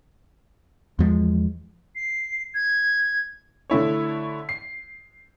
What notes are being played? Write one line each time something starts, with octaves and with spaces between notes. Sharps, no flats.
E2 F3 G#3
C7
G#6
D3 A3 E4 C#5
C7